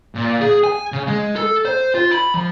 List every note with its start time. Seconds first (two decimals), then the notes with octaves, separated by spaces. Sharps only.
0.15 A#2
0.41 G#4
0.64 G#5
0.92 C#3
1.07 G#3
1.36 A4
1.65 C5
1.95 F4
2.12 B5
2.34 F3